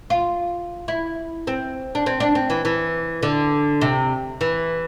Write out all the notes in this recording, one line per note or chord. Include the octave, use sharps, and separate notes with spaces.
F4
E4
C4
D4
C4
D4
C4
E3
E3
D3
C3
E3